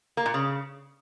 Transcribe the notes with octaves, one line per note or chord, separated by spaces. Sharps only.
A#3
A#2
C#3